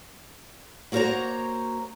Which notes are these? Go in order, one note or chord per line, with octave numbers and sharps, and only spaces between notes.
A#3 F#4 A#4 C5 C#5 A#5